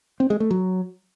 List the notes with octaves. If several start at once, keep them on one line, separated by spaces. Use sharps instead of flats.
C4
G#3
A3
F#3